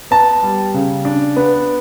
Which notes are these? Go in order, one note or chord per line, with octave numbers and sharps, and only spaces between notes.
B3 A5
G3
C#3
D4
B3